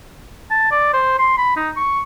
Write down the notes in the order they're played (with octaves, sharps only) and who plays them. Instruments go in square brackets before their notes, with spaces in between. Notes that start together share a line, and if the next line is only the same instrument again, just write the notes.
[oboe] A5
D5
C5
C6
B5
D#4
C#6